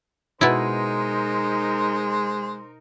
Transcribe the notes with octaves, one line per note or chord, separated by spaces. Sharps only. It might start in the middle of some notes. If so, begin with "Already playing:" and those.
B2 G#3 D#4 E4 A#4 C5